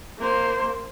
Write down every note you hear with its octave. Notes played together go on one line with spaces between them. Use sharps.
A#3 C5